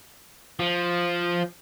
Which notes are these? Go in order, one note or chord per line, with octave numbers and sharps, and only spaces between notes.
F3